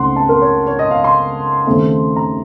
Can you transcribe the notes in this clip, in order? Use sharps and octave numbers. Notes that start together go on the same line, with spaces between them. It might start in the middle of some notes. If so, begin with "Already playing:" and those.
Already playing: C#2 C#3 A3 C4 D#4 F#5 C6
A5
A#4
C#5
C#5
D#5
F5
C6
D#2 C#3 A3 C4
A#5